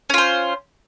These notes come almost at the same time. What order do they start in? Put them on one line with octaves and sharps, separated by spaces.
C#4 F4 C5